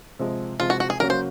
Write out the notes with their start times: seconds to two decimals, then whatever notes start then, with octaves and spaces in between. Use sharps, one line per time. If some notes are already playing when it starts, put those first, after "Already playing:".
0.19 C3 F3 G#3
0.60 C3 F3 G#3 F4
0.70 F#4
0.80 F#4
0.90 G#4
1.00 C#3 F#3 A#3 C#4 F#4 A#4
1.10 C5